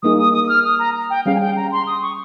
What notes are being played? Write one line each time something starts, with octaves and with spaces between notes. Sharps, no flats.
G3 A#3 D#4 G#4 D#6
D#6
D#6
D#6
F6
D#6
A#5
G5
G3 C#4 G#4 F5
G#5
G5
A#5
C6
D#6
C#6